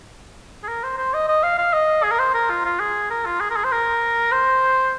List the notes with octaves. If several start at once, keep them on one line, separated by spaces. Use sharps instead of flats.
G#4
A#4
C5
C5
D#5
D#5
F5
F5
D#5
G#4
A#4
C5
A#4
F4
F4
G#4
A#4
F4
G#4
A#4
G#4
C5
A#4
C5